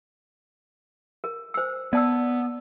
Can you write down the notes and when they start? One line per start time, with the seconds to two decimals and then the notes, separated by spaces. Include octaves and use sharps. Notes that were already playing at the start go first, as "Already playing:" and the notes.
1.24 A#4
1.54 C5 E6
1.93 B3 D5 A5 E6